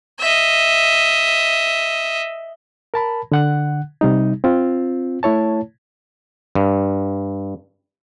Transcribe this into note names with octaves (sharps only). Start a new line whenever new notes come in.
D#5 E5
A#4 A5 B5
D3 F#5 F#6
C3 G3 D#4
C4 F4
A3 E4 C#5 A5
G2